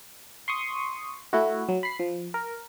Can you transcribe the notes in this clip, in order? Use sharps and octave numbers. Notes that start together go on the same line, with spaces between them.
C6 C#6 D#6
A3 E4 F#4
F#3
B5 C7
F3
A#4